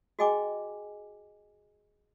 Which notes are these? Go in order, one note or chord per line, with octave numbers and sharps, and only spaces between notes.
F#4 G#4 D#5 G5 G#5 D6